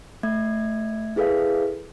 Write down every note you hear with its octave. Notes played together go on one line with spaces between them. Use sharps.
A3 E5 G#6
E4 G#4 A4 B4 E5 F5